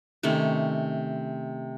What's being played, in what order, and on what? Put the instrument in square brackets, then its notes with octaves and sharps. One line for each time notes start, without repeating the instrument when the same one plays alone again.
[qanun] C3 D#3 A3 C#4